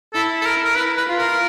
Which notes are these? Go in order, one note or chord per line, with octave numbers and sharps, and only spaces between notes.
E4 A4
A4
A#4
A#4
E4 B4
B4
F4
A#4